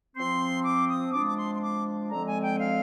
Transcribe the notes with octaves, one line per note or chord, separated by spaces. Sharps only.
F3 C4 C6
D6
D#6
F3 G#3 D4 D6
D6
C6
C6
D6
D3 F3 G#3 C4 A#5
G#5
G5
F5